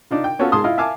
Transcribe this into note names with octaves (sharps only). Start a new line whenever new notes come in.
D4 D#4 F4
G5
B3 C#4 F4 F#4 A4
G#2 G#4 A5 C6 D#6
E4 F4 D#5 F5
E5 F5 G#5 A5 D6